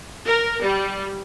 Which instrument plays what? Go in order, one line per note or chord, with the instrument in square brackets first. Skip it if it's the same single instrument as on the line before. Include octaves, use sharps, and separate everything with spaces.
[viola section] A#4
G3